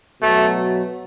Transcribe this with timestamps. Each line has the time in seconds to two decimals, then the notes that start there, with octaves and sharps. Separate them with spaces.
0.21 B2 F#3 A3